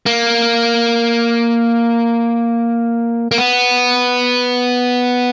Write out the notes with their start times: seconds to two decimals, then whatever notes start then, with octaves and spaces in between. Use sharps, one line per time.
0.06 A#3
3.31 A#3
3.38 B3